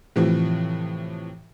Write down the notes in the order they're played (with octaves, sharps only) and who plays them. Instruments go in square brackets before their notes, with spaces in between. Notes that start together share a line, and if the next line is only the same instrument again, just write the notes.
[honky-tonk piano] A2 C3 E3 F3